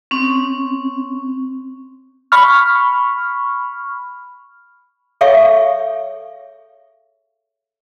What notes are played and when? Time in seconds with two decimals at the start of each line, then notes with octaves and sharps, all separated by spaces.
0.11 C4 C#4
2.32 B5 C#6 F6
5.21 G#4 A4 C#5 E5 F5 C#6